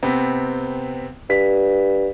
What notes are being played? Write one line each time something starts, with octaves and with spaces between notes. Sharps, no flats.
C3 B3 C4
G2 B6